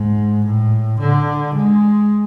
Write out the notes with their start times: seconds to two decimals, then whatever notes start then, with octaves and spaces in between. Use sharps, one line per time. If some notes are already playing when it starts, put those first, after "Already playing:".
Already playing: G#2
0.45 A2
1.00 D3
1.55 G#3